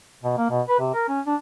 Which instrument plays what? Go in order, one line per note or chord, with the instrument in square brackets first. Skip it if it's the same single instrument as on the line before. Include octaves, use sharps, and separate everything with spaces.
[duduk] B2
A#3
B2
B4
C3
A#4
C#4
D4